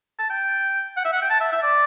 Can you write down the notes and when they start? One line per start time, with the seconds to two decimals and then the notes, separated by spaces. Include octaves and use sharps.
0.19 A5
0.30 G5
0.97 F#5
1.05 E5
1.13 F#5
1.22 G5
1.30 A5
1.41 E5
1.52 E5
1.62 D5